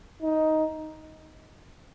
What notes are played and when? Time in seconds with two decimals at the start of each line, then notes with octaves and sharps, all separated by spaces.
0.22 D#4